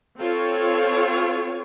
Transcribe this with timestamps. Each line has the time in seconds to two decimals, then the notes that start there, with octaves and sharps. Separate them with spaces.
0.18 C4 F4 A4 C#5